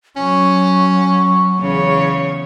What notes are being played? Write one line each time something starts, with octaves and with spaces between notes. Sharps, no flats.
F#3 C#4 C#6
E2 C#3 C#5